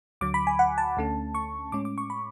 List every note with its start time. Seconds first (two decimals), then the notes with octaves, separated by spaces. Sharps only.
0.21 D2 D3 F#3 D6
0.34 B5
0.47 G#5
0.59 F#5
0.78 A5
0.97 D2 D3 A3 C#4
1.35 C#6
1.72 A2 G#3 C#4 D6
1.85 D6
1.98 C#6
2.10 B5